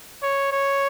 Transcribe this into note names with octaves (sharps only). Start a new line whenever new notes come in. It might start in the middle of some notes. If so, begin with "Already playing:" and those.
C#5
C#5